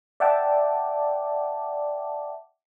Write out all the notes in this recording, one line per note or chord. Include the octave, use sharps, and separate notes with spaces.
D5 E5 F#5 G5 A5 D6